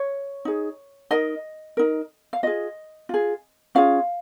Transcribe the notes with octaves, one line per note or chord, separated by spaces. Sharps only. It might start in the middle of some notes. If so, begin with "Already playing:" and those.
Already playing: C#5
D#4 G#4
D#4 A#4 D#5
D#4 A#4
F5
F4 G#4 D#5
F4 G#4
C#4 F4 G#4 F5